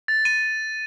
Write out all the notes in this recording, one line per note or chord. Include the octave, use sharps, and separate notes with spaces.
A6
D#7